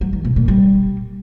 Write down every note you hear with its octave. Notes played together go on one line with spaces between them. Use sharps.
F#3
D#3
B2
A#2
G3